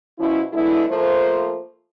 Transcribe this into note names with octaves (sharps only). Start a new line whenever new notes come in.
B2 F3 C#4 E4
D3 G#3 B3 E4
F3 A3 A#3 C5